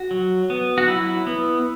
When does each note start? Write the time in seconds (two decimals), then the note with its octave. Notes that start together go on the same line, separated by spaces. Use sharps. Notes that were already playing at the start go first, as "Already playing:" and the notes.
Already playing: F#4
0.11 F#3
0.50 B3
0.78 F#4
0.88 F#3 E4
1.27 B3